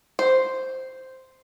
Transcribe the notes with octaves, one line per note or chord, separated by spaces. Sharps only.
C5